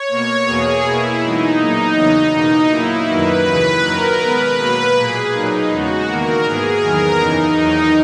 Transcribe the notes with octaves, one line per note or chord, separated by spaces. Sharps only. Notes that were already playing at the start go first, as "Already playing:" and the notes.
Already playing: C#5
B2 A#3
E2 B2 A#3 G#4
B2 A#3 E4
F#2 E3 G#3 B3 D#4
A#2 F#3 A#3
E2 C#3 F#3 B3
E2 B2 A#3 D#4
A#2 F#3 A#3 E4
F#2 D#3 F#3 A#3 B4
D#2 C#3 E3
F#2 D#3 F#3 A#4
B2 G#3 B3 B4
B2 F#3 A#3
A#2 A#3 G#4
A#2 F#3 A#3 D#4
E2 C#3 G#3 B3 F#4
E2 D#3 A#3 A#4
G#2 E3 B3 G#4
E2 D#3 F#3 B3 A#4
F#2 C#3 E3 D#4
E2 D#3 F#3 A#3